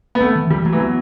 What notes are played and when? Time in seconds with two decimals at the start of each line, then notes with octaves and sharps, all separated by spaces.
0.15 B3
0.20 A3 C4
0.35 E3
0.50 E3 G3
0.65 F#3 A3
0.73 E3
0.80 F#3 B3